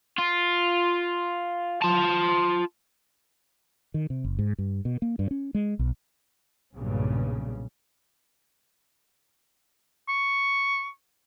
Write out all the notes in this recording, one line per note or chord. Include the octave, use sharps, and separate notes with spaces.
F4
F4 A5
D#3
C3
F#1
G#2
G2
B2
A#3
G2
C#4
G#3
B1
B1 G2 A#2 C#3
C#6